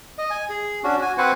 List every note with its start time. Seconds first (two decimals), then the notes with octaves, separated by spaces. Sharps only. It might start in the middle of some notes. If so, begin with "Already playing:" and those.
0.18 D#5
0.31 G#5
0.50 G#4
0.84 C#4 D4 F#4
1.02 F#4 G#5
1.18 C4 F#4 B4 C5 F#5 G#5